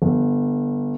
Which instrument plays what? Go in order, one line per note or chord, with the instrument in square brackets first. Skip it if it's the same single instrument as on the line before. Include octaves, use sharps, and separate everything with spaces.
[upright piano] G1